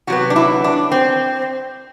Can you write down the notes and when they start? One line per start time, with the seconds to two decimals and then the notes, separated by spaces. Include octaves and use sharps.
0.07 C3 F#3 B3 F#4
0.30 D4
0.36 E4
0.64 D4
0.92 C4